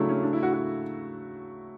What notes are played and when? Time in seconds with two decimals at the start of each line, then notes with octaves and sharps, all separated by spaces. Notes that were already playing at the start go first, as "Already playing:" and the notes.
Already playing: C#3 F#3 A3 D4 E4
0.09 C#4
0.23 D4
0.33 E4
0.43 F#4
0.53 F#4